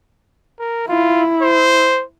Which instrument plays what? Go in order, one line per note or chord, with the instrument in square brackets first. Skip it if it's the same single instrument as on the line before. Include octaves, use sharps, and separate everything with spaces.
[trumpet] A#4
[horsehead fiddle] E4 [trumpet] F4
[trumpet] C5